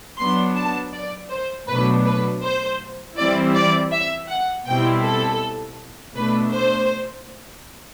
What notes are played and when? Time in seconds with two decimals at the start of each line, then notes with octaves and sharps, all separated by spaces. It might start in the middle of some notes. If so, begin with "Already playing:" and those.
0.19 F#3 B3 D4 C6
0.57 A5
0.94 D5
1.31 C5
1.69 B2 F#3 A3 D4 B4
2.06 B4
2.43 C5
3.18 E3 G3 C4 E4 D5
3.55 D5
3.92 E5
4.29 F#5
4.67 B2 G3 C4 E4 G5
5.03 A4
6.15 B2 A3 D4 B4
6.53 C5